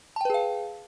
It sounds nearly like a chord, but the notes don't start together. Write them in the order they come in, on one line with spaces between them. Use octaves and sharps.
A5 G5 B4 G#4 F5